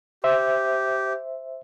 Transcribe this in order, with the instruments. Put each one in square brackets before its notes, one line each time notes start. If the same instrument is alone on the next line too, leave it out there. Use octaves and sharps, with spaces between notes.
[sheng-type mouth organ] G4 [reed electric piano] C5 E5